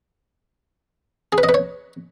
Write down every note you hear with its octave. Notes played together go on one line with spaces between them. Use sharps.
G#4
B4
D#5
B4
C#5